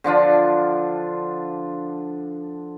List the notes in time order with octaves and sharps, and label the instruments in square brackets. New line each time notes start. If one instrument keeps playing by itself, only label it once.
[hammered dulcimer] D3 F3 D4 F4